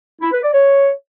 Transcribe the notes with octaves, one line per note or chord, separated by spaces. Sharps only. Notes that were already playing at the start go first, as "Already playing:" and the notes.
E4
B4
D5
C#5